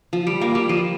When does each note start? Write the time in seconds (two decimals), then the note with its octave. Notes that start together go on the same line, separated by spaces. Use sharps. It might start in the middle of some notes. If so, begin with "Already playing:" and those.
0.13 F3
0.27 G3
0.41 A#3
0.55 G3
0.69 F3